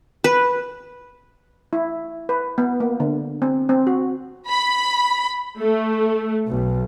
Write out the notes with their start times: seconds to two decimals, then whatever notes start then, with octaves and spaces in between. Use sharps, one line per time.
0.24 B4
1.73 E4
2.29 B4
2.58 B3
2.80 A#3
3.00 D3
3.42 C4
3.69 C4
3.87 F#4
4.48 B5
5.59 A3
6.49 B1